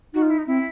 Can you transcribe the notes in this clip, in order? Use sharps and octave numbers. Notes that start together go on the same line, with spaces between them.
D#4 F#4
F4
E4
D#4
C4 E4